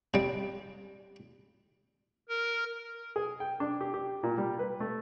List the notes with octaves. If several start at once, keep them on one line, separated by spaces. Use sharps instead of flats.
C3 G3
A#4
G#4
G5
D4
G4
G4
A#2
G3
B4
A3